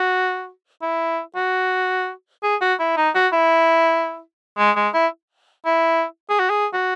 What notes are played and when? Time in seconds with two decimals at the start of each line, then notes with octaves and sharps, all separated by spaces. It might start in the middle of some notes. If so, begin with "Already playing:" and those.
Already playing: F#4
0.82 E4
1.36 F#4
2.43 G#4
2.61 F#4
2.80 E4
2.97 D#4
3.15 F#4
3.33 E4
4.58 G#3
4.76 G#3
4.94 E4
5.66 E4
6.30 G#4
6.39 F#4
6.50 G#4
6.73 F#4